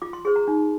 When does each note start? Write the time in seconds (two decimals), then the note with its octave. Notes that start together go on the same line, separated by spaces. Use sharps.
0.02 F4 D6
0.13 C6
0.25 G#4 C5 C6
0.36 A#5
0.48 D#4